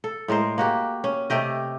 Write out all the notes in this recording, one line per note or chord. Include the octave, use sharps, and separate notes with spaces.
A4
A2 G#3 A#4 C5
A#3 F#4 G4
C#4
C3 A3 G4 D#5